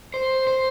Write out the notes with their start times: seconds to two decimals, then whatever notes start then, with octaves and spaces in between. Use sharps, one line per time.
0.14 C5
0.47 C5